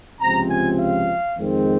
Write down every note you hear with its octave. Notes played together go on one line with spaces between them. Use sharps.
C#2 C3 F3 C4 A#5
G#5
F5
F2 D#3 G#3 C4